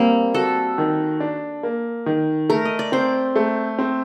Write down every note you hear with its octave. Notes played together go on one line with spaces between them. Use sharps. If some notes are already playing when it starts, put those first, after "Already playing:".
Already playing: G3 A#3 C4
F#4 A4
D#3
D4
A#3
D#3
A3 A#4
D#5
D5
C4 C5
A3
C4